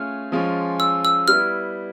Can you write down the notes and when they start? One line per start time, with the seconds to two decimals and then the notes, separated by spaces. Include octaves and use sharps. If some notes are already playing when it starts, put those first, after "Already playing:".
Already playing: A3 C#4 F4 G#4 F6
0.32 F3 G#3 C#4 F4
0.80 E6
1.05 E6
1.28 G3 B3 E4 F6